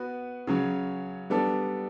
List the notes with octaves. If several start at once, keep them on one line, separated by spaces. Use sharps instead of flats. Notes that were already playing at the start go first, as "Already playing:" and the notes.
Already playing: B3 F#4 B4
C#3 F#3 C#4
G3 B3 D4 A4